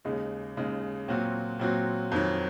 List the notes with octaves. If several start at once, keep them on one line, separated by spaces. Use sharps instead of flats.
D#2 C#3 G#3 D#4
D#2 C#3 G#3 D#4
A#2 F#3 C4 F#4
A#2 F#3 C4 F#4
F2 D#3 F#3